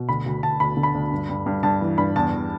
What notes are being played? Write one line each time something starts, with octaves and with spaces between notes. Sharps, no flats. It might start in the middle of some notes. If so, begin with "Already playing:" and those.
Already playing: B2
D2 B5
D2
D2 A5
D2 B5
D3
B5
D2
G2
G2
G2
G2 A5
E3
G2 B5
E2 A5
E2